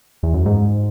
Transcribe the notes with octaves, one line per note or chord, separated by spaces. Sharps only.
E2
F#2
G#2